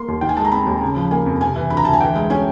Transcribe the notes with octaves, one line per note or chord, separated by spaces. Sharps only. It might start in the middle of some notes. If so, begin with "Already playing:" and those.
Already playing: A#3 C6
D#2
D#3 G5
G#5
G#3 A5
A#5
C4 B5
D#2
C#3
F3
A#3 G#5
F2
C3 G#5
E3
D2 B5
A#5
D2 A5
G#5
E3 G5
G#3
C#4 G#5